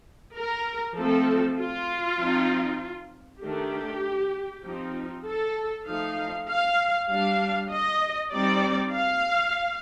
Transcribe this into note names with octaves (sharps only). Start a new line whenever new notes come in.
A#4
F3 A3 C4 A4
F4
F3 C4 D#4
D#3 A3 D4 G4
F3 C4 D#4
A4
F3 A3 D#4 F5
F5
G3 D4 F5
D#5
G3 C4 D#4 D5
F5